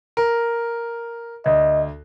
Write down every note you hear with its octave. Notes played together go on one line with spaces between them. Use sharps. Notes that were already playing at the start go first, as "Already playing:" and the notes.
A#4
D2 D#5